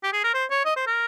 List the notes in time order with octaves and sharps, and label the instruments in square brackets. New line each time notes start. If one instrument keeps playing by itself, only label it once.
[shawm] G4
G#4
A#4
C5
C#5
D#5
C5
A#4